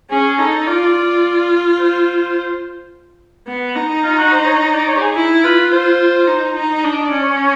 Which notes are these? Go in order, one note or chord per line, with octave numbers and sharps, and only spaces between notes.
C#4 G#4
D#4 A4
F4 D5
F4
C5
B3
D#4
F4
F#4
C5
C#5
D5
C#5
G4
G#4
E4
F4 B4
C5
D#4
D#4
D4 D#5
D5
C#4
C#5